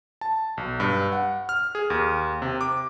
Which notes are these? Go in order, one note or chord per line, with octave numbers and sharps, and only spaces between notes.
A5
B1
G2
F#5
F6
G#4
D#2
C3
D6